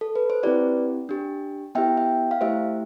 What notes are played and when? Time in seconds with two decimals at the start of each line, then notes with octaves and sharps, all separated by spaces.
0.01 A4
0.16 B4
0.30 C5
0.43 C4 E4 G4 B4 D5
1.09 D4 G4
1.75 B3 E4 G4 E5 G5
1.97 E5 G5
2.31 F5
2.41 A3 E4 G4 C5 E5